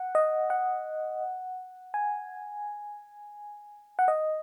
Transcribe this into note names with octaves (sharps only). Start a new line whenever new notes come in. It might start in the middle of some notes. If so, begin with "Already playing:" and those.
Already playing: F#5
D#5
F#5
G#5
F#5
D#5